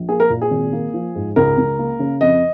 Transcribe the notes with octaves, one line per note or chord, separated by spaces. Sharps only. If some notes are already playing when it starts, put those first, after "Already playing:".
Already playing: A#1
A#3 G#4
A#4
A#2
G#4
G#1
A#3
F3
G#2
C#2 A#4
C#2
A#3
C#3
F2 D#5